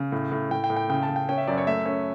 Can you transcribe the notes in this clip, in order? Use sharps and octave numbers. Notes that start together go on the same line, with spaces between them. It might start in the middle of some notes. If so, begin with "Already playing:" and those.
Already playing: C#3
A2
A2
A2 G5
G5
A2
G5
C#3 G5
A5
C#3
G5
C#4 G5
E5
F#2 D5
C#5
A3 E5
C#4